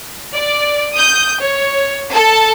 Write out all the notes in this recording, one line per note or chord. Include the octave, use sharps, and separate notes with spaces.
D5
D#6 G6
C#5
A4 A5